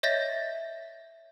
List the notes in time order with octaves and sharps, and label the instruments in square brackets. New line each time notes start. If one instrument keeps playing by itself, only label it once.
[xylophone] C#5 D#5 E5 G6 A6 A#6